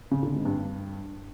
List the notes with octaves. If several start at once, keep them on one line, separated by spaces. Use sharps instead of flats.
C#3
D3
G#2
G2